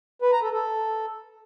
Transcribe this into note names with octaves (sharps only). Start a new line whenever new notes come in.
B4
A#5
A4
A4